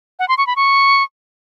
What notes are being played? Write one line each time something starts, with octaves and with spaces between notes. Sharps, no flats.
F#5
C6
C#6
B5
C#6